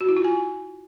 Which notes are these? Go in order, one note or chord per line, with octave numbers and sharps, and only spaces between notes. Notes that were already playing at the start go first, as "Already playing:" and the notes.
F#4
E4
F4
G#5